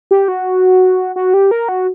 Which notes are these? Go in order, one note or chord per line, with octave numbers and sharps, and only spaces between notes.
G4
F#4
F#4
G4
A#4
F#4